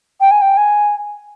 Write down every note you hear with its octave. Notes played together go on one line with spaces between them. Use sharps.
G5
G#5
G5
G#5